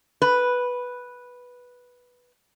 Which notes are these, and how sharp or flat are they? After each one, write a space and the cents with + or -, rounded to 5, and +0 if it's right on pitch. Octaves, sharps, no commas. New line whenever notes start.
B4 -5